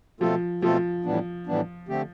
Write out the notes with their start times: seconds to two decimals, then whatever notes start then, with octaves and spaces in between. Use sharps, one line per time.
0.20 B2 F3 A3 C4 F4 A4
0.62 B2 F3 A3 C4 F4 A4
1.04 A2 E3 G3 B3 D4
1.47 A2 E3 G3 B3 D4
1.88 D3 A3 C4 G4